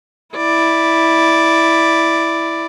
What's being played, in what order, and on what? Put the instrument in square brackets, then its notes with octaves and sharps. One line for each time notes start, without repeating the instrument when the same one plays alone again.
[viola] E4 D5